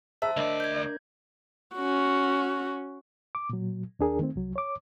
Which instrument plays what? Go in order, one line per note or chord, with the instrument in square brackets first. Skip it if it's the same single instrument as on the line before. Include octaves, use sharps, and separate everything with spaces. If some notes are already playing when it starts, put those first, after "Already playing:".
[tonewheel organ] G#4 A#5 [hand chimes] C5 A5 E6 [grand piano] E5
[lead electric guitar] D2 D5 [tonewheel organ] D4 A#4 [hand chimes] D#5
[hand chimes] G6 G#6
[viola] C#4 F#4
[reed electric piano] D6
A#2 F#3
D#2 D4 G#4 A#4
D#3 A3 C4
C2 F#3
C#5 D6